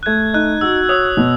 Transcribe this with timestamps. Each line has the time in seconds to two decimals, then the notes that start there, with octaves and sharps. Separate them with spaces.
0.03 F#6
0.06 A3 G#6
0.34 D#4 F#6
0.61 F#4 E6
0.89 C#5 D#6
1.17 B2